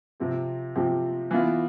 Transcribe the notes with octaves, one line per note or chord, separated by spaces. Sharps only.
C3 F3 C4 G4
C3 F3 C4 G4
E3 B3 F4